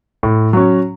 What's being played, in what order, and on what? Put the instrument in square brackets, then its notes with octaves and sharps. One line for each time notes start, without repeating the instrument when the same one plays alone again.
[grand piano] A2
F#3 C#4